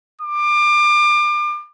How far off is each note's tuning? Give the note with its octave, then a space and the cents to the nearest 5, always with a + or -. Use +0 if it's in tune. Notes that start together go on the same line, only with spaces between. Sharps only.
D6 +30